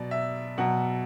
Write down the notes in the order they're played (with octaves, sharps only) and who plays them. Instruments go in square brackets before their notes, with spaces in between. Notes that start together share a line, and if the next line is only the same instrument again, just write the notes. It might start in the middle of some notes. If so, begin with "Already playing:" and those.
Already playing: [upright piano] B2 F#3 D5
E5
B2 F#3 F#5